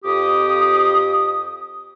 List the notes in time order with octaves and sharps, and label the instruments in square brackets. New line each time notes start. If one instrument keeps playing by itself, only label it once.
[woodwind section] F2 G4 D#6